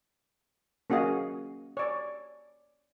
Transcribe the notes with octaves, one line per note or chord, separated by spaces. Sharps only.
A#3 C#4 F#4 G#4 D#5 F5
C#5 D5